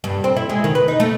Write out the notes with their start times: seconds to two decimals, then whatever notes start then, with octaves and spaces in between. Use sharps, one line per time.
0.04 G2
0.24 C4
0.36 E4
0.49 G#3
0.64 D#3
0.75 B4
0.88 D#4
1.00 A3